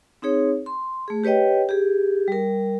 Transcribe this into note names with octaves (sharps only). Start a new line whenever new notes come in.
C4 D#4 G#4 C#5
C6
A3 G#4
G4 B4 C#5 D#5 G5
G4 G#4
G3 A#4